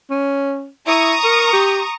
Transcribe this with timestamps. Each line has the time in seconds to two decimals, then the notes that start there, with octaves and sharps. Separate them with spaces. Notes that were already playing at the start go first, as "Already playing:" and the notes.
0.10 C#4
0.87 E4 A#5 C#6 D#6
1.24 A#4
1.53 G4